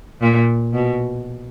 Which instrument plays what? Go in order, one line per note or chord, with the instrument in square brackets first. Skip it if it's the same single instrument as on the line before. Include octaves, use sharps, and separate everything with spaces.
[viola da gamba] A#2
B2